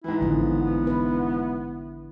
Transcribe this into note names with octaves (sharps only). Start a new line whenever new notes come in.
G#2 E3 E4
A1 D3 F3 B3
B3
E4 B4